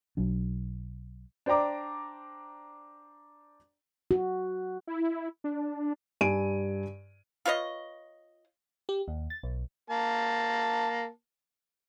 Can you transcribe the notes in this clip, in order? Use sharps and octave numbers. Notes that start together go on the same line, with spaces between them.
B1 F#3 D4
D4 C5 D5 G5 A#5 D6
F#4
E4
D4
G2 G#5 D7 D#7
F4 B4 C#5 D#5
G4
D#2
A6
B1
A#3 A5